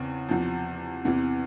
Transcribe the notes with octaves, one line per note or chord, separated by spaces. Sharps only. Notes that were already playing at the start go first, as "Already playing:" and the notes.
Already playing: E2 C#3 C4
E2 C3 F3
E2 C3 E3